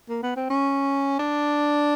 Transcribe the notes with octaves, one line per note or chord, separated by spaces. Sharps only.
A#3
B3
C4
C#4
D4